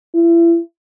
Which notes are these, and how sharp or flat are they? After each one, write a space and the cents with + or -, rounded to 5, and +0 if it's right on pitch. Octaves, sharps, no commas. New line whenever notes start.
E4 +35